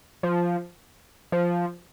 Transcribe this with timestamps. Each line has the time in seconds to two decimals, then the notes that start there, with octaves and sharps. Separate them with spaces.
0.23 F3
1.32 F3